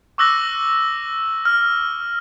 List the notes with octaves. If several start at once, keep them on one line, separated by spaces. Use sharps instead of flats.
C#6 D6 E6 F#6 A#6 F#7
F6